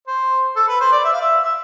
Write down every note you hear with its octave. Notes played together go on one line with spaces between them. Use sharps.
C5
A4
B4
C5
D5
E5
F5
E5
E5